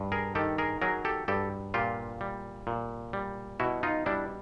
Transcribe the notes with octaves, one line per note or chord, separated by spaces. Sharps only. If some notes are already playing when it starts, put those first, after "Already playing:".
Already playing: G2
G#4 A#4
D#3 G4 A4
G#4 A#4
F#3 G#4 A#4
G4 A4
G2 G4 A4
A#2 F4 G4
G3
A#2
G3
B2 E4 F#4
D#4 F4
G3 D4 E4